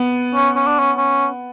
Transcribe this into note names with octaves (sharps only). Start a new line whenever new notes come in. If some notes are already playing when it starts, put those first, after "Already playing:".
Already playing: B3
C#4
C#4
D4
C#4
C#4